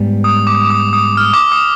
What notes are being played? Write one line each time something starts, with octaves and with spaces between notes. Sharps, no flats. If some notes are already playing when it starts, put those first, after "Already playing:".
Already playing: G#2 G3 B3
D#6
D6
D6
D#6
D#6
F6
D6
D#6